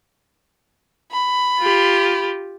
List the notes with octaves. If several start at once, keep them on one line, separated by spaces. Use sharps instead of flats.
B5
F4 G4